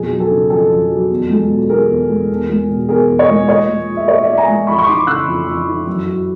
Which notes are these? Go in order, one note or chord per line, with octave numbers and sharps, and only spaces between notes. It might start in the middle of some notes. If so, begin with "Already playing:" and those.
Already playing: F2 B2 G#4
F#3
A4
C#3
F2 A4
F2
F#3
E2
G#3
B2
E2 G#4 A#4
E2
G#3
E2
G#3
B2
E2 G#4 A#4
E2
C#5 D#5
G#3
A#2 C#5 D#5
G#3
F3
E5
A#2 C#5 D#5
A#2 D5 E5
G#5 A#5
G#3
F2 B5 C#6
C#6
E3 C6 D6
C#3 E6 F#6
F2
F2
E3
F#2
F#3